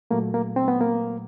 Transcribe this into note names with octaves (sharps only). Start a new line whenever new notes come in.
A#2 F#3 A3 A#3
A#3
C4
B3
A#3